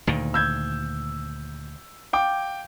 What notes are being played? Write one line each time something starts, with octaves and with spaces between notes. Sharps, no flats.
D2 A#2 D#3
E6 G6 G#6
F5 G5 D6